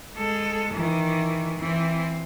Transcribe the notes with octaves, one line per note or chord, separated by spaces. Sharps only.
G#3 A4
D#3 E3
E3 C4